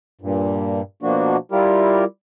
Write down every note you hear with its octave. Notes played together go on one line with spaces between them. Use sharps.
G2 A#2
B2 F3 A#3 D4 F#4
G3 E4 F4 G4 A#4